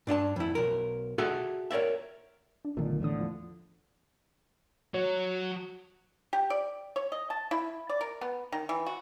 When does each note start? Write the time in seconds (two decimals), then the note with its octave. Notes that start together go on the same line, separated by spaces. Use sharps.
0.07 G2 D4 D#5 A5
0.36 F2 E4
0.55 B1 A#4
1.18 F#4 G#4 A4 D5 E5
1.71 A#4 C#5 D5 E5
2.65 D4
2.77 B1 A#2 D3 D#3 A3
3.00 E2 A2 D3 E3 D#6
3.21 F3
4.94 F#3 C#5
6.33 G4
6.50 D5
6.96 C#5
7.12 D#5
7.30 A5
7.51 E4
7.89 D5
8.01 A#4
8.21 B3
8.52 D#3
8.69 E3
8.86 F#4